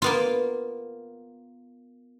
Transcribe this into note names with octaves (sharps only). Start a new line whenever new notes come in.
A#3 B3 F4